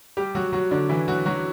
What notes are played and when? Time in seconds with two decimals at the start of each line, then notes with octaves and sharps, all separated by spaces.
0.17 G3 G4
0.35 F#3 F#4
0.53 F#3 F#4
0.71 D3 D4
0.89 E3 E4
1.08 F#3 F#4
1.25 F#3 F#4